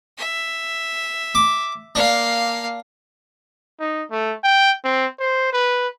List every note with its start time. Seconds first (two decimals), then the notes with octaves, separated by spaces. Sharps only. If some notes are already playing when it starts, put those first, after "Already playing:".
0.18 E5
1.35 D6
1.95 A#3 D4 F5
3.80 D#4
4.11 A3
4.44 G5
4.84 C4
5.19 C5
5.53 B4